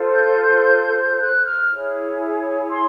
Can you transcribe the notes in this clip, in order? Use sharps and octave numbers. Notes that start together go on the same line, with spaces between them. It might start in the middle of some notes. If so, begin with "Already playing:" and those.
Already playing: F4 A4 C5
G6
F#6
F6
E4 G#4 C#5
C6